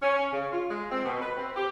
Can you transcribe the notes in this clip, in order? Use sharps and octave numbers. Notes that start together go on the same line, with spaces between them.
C#4
C#3
F4
G#3
C4
B2
B4
C4
G4